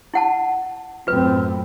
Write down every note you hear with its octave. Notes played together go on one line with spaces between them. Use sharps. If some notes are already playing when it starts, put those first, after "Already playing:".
E4 F#5 A5
F#2 A2 C4 F4 B4